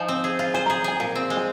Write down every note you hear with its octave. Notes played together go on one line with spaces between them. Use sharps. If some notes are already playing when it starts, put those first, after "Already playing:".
Already playing: F3 D#4 G#5
C4
G#4
F4
C5 G#5
G#4 A#5
G#4 G#5
A#2 G#5
C4
G#3
G#5